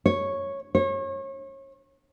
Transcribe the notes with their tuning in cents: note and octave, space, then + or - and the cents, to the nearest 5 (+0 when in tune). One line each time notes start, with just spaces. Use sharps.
C#5 -5
C#5 -35